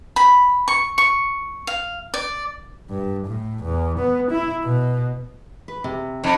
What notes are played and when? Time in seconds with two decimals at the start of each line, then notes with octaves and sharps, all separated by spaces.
0.16 B5
0.68 C#6
0.98 C#6
1.67 F5
2.14 D5
2.90 G2
3.26 A2
3.63 E2
3.99 B3
4.31 E4
4.64 B2
5.68 B4
5.84 C3
6.24 F2 D#4